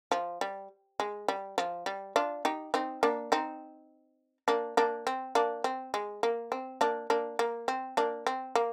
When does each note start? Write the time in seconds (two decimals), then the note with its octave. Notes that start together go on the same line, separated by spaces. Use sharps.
0.12 F3
0.41 G3
1.00 G#3
1.28 G3
1.58 F3
1.86 G3
2.16 D4 F4
2.45 D#4 G4
2.74 C4 D#4
3.03 A#3 D4
3.32 C4 D#4
4.48 A#3 D4
4.77 A#3 D4
5.07 C4
5.35 A#3 D4
5.64 C4
5.94 G#3
6.23 A#3
6.52 C4
6.81 A#3 D4
7.10 A#3 D4
7.39 A#3
7.68 C4
7.97 A#3 D4
8.27 C4
8.55 A#3